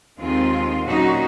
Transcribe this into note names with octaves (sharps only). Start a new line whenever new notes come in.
D#2 D#3 G#3 C4 F4
A#2 F#3 C#4 D#4 F#4